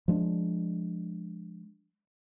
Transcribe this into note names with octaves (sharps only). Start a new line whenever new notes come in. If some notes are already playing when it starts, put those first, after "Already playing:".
F3 G#3 D4